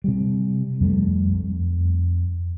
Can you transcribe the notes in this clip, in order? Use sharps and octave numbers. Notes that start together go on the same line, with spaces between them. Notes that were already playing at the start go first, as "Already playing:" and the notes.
C3 G3
F2 G3 A3
F2